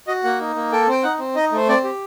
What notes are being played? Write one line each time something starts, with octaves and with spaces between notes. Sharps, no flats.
F#4 D#5
A#3 F#5
D#4
A#3
A4 G5
C4 G5
D#4 F#5
C4
D#4 D#5
A3 C5
C4 D5
G4